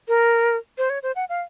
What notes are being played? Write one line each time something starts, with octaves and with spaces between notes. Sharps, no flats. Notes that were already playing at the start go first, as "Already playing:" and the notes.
A#4
C5
C#5
C5
F#5
F5